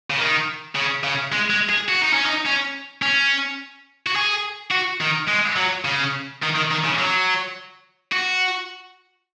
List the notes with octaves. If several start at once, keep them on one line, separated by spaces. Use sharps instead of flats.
C#3
D#3
C#3
C#3
G#3
G#3
G#4
F#4
D#4
C#4
D#4
C#4
C#4
F#4
G#4
F#4
D#3
G#3
F#3
C#3
D#3
D#3
D#3
C#3
F#3
F#4